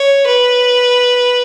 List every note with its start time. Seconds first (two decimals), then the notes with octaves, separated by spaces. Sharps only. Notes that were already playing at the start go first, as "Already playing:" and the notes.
Already playing: C#5
0.27 B4